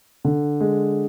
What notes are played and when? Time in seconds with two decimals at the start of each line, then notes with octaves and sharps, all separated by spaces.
0.25 D3
0.61 G#3